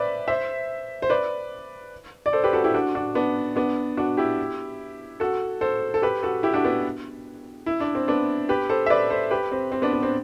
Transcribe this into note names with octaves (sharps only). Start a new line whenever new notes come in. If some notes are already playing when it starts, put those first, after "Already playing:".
Already playing: B4 C5 D5 E5
C5 E5
C5
B4 D5
D5
A4 C5
G4 B4
F#4 A4
E4 G4
D4 F#4
D4 F#4
B3 D4
B3 D4
D4 F#4
E4 G4
F#4 A4
A4 C5
A4
G4 B4
F#4 A4
E4 G4
D4 F#4
B3 D4
E4
D4
C4
B3 D4
G4 B4
A4 C5
E5
B4 D5
A4 C5
G4 B4
C4
C4
B3 D4
B3
C4